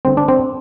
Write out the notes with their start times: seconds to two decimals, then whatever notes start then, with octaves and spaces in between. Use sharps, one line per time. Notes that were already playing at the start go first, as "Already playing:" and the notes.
0.05 G1 G2 D3 C4
0.17 D4
0.28 C4